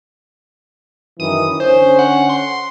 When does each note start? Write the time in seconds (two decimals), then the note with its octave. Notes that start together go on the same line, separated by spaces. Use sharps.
1.20 F#2 D#3 E3 D#6
1.60 D3 C#4 C5
1.99 F#5
2.29 C6